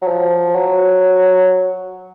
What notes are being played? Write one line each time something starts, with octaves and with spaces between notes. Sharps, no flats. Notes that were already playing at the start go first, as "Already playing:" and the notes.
F#3
F3
F#3